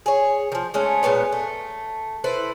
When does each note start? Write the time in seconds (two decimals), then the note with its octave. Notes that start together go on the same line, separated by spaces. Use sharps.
0.06 G#4 C#5
0.52 D#3 F3
0.74 G#3 A3 C#4
1.03 A#2 G#3 B3 C#5
1.32 A3
2.24 E4 A4 B4 C5